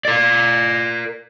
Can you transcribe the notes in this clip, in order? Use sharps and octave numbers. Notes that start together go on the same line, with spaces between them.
A#4 D5